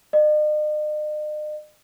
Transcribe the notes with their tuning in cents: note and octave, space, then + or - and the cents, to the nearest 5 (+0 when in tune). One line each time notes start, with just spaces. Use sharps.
D#5 -45